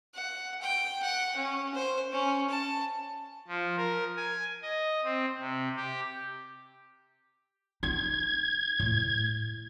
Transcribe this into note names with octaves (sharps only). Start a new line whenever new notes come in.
F#5
G5
F#5
C#4
C5
C#4
A5
F3
A#4
G#5
D#5
C4
C3
G4
D#4 G#6
A2